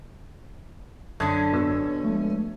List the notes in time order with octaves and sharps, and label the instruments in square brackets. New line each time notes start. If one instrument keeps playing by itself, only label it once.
[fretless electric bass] F#2 [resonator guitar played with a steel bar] D3 C#4 [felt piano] A5 D#6 G#6
[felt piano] B2 E6
[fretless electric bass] F3 G#3 [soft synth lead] A3